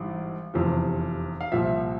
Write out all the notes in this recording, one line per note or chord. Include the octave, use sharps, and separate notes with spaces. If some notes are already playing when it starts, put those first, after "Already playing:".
Already playing: G#1 G2 E3
F1 E2 C3 F3
F5
C2 A#2 F3 E5